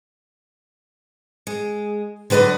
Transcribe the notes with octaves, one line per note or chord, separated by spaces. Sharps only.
G#3
D3 F#3 B4 D5 D#5